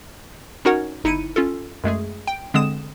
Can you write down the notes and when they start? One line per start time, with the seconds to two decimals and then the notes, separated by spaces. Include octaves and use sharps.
0.65 C#4 D#4 F#4 A#4 C#5 F#5
1.04 G1 D#4 E4 C#7 D#7
1.36 C#4 F4 A4
1.84 F#2 G#3 A3 G#4
2.27 G5
2.54 D3 G#3 C4 D#6 E7